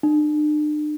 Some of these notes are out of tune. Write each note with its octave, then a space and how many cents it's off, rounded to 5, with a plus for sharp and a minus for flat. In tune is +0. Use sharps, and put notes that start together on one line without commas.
D4 +45